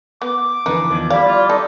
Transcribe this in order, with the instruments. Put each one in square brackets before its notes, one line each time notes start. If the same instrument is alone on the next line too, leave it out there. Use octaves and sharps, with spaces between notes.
[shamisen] B3 [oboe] D6
[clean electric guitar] F2 D3 E3 [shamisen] D#4 B4
[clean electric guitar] E2 D#3 F3
[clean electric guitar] G3 E4 [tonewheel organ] D5 [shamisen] F5
[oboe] F4
[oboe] D#4 [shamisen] A4